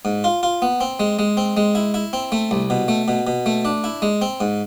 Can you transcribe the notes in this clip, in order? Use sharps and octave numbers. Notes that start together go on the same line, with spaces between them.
G#2
F4
F4
B3
C4
G#3
G#3
C4
G#3
E4
E4
C4
A3
C2
B2
A3
B2
B2
A3
D4
E4
G#3
C4
G#2